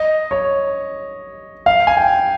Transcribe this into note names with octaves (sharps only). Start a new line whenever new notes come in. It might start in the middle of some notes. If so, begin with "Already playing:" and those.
Already playing: D#5
C#5
F5
G#5
G5